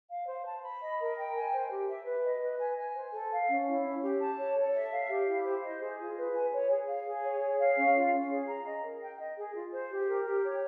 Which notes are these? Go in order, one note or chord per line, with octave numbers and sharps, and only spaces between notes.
F5
C5
A5
B5
D#5
A#4
G5
G#5
C5
G4
E5
B4
D#5
B4
G#5
G#5
C5
A4
F5
C#4
E4
C#4
G4
A5
C#5
A4
E5
F5
G4
E4
C5
D#5
G#4
F4
B4
G#5
C#5
G#4
F5
G#4
C#5
G#4
F5
C#4
F4
C#4
G#4
A#5
D#5
A#4
G5
D#5
G#4
F4
C5
G4
A#4
G4
C#5